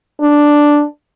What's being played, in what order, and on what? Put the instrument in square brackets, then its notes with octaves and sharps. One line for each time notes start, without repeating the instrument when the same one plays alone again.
[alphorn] D4